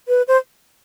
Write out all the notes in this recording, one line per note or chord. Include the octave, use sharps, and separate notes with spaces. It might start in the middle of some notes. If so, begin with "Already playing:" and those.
B4
C5